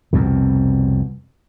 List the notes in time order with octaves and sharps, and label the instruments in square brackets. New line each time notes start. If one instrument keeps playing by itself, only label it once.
[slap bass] C2 F2 B2